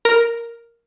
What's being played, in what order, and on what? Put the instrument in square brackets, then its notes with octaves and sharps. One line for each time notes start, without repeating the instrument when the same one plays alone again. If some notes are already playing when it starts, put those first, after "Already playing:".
[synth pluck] A#4